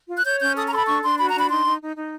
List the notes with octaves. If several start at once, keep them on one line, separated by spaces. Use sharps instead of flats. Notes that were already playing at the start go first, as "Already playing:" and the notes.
F4
F#6
C#5 G6
C#4 G6
A4 D#6
A#5
A4 C6
B5
D4 C#6
D4 C6
F#4 B5
A#5
D4 B5
D#4 C6
D#4
D#4
D#4